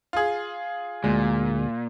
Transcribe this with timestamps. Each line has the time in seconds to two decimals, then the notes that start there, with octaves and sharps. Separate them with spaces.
0.13 F4 G#4
1.04 D2 A#2 G#3